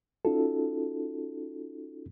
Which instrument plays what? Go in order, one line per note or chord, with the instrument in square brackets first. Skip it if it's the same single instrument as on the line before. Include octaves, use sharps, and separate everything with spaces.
[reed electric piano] C#4 D#4 F4 F#4 A4